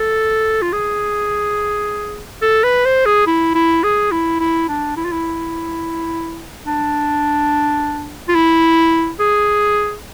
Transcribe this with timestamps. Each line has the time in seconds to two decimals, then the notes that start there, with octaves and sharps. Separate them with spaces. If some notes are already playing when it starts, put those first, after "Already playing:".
Already playing: A4
0.62 F4
0.73 G#4
2.42 A4
2.64 B4
2.85 C5
3.06 G#4
3.27 E4
3.55 E4
3.83 G#4
4.12 E4
4.40 E4
4.69 D4
4.97 E4
5.05 F4
5.12 E4
6.67 D4
8.28 F4
8.35 E4
9.19 G#4